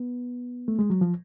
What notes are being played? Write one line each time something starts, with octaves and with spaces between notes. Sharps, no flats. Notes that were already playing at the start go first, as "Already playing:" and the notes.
Already playing: B3
A3
G#3
F#3
F3